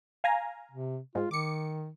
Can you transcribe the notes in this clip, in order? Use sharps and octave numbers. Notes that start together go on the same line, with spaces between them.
F5 G#5 A#5
C3
G#2 G#3 F4
D#3 D6 C#7